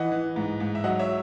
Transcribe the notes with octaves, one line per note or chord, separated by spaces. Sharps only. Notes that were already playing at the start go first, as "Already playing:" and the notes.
Already playing: E3 D#5 F#5
E3
G#2
G#2
E5
F#3 D#5 F#5
C#5 E5